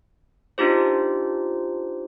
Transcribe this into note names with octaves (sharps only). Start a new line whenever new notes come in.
D4 D#4 F4 G4 C5